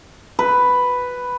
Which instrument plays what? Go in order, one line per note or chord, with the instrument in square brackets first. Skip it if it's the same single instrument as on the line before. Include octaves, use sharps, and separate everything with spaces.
[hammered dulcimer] B4